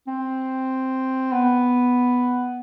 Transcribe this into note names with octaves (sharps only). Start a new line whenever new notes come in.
C4
B3